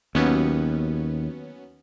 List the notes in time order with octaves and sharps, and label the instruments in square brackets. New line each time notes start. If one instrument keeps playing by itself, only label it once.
[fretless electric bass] D#2 [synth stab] F#3 B3 C#4